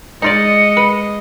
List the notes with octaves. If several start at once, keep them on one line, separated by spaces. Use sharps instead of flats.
G#3 D#4 F4 D5 D#5 C#7
B4